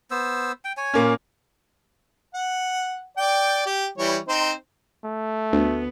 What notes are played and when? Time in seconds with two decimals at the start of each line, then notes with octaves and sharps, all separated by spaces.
0.11 B3 C5 E6
0.65 G5
0.77 C#5 G#5
0.94 A#2 A#3 C#4
2.34 F#5
3.17 D5 G5
3.66 G4
3.98 E3 G3 C#5
4.28 C4 D#4 C5
5.04 A3
5.53 D2 B3